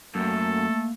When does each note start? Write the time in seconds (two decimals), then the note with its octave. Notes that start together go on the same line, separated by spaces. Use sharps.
0.15 F#2 A3 A#3 A4